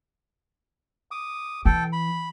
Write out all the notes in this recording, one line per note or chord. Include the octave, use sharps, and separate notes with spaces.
D6 D#6
E3 A4 G5
B5